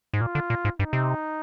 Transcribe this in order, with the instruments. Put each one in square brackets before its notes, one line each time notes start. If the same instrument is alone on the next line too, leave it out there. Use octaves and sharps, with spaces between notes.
[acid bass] G#2
[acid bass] A#2 [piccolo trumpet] F4
[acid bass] D3
A#2
G#2
[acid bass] G2 [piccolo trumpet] D#4
[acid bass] C3